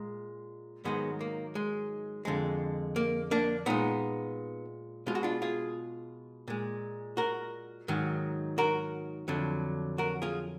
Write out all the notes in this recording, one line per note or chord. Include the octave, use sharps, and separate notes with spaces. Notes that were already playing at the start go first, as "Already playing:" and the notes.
Already playing: A#2 G#3
G#2 D#3 F#3 G#3 B3
A#3
G#3
F2 D3 G#3
A#3
A#3 D4
A#2 G#3 B3 D#4
B2 G#3 F4
F#4
D4 F4
F4 G#4
A#2 G#3
F#4 A#4
G#2 D#3 F#3
F#4 A#4
F2 D3 F#3
F#4 A#4
F4 G#4